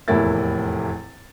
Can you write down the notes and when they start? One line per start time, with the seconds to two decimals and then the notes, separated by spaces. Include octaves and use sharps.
0.08 F1 E2 A2 A#3 E4 A6